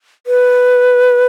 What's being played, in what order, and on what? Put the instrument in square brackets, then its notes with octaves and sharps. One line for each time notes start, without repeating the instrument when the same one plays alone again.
[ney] B4